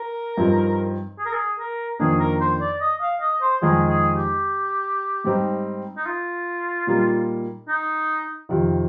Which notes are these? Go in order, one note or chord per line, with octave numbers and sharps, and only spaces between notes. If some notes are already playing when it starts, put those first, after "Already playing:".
Already playing: A#4
G2 F3 C4 D#4
G#4
A#4
G#4
A#4
F2 D#3 A#3 D4 G#4
A#4
C5
D5
D#5
F5
D#5
C5
F2 D#3 G#3 D#4 G#4
G#4
G4
G#2 G3 C4 D#4
D#4
F4
A#2 G3 A#3 D#4
D#4
F2 C3 D#3